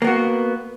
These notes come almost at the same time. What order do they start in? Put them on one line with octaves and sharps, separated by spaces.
A#3 B3 F#4